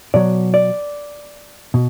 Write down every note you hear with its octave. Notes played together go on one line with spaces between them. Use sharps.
B2 F#3 D5
D5
B2